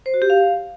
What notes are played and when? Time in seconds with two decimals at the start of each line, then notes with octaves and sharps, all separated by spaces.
0.06 C5
0.14 F#4
0.22 G4
0.30 F5